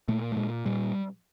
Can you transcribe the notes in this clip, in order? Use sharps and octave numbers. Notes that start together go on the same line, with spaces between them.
A#2 A3
A3
A#2 G#3
A#2 G3